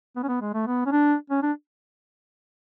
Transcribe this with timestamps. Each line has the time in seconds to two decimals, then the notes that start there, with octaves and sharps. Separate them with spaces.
0.16 B3
0.23 C#4
0.29 B3
0.41 G#3
0.54 A3
0.67 B3
0.86 C#4
0.92 D4
1.30 C#4
1.43 D4